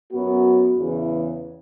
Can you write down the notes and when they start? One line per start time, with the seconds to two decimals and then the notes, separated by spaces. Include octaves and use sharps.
0.11 F#2 F#3 B3 F#4
0.77 E2 C#3 E3